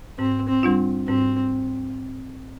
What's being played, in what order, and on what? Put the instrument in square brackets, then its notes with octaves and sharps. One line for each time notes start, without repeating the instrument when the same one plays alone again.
[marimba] G#2 [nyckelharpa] C4
[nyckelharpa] C4
[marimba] G3 D4 F4
[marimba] G#2 [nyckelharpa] C4